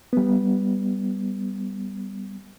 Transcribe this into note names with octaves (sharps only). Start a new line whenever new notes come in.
G3 B3